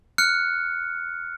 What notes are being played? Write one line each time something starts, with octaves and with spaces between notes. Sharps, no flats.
F6 F#6 C#7